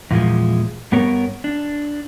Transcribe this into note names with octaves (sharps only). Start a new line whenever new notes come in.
E2 A#2 F3 G#3
G2 B3 A#4 C#5
D4